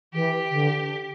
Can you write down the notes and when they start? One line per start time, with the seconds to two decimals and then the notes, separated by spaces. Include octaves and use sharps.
0.14 E3 G4
0.51 D3